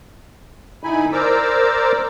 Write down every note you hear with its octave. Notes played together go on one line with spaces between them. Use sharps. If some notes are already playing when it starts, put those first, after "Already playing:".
D3 D#4 E4 G#5 B5
A#4 C5 D5 A#5 D6 E6